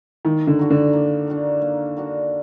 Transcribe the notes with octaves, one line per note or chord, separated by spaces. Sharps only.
D#3 A#3
D3
D4 F#4 A#4
D3
A#3
D4 F#4 A#4
A#3
D4 F#4 A#4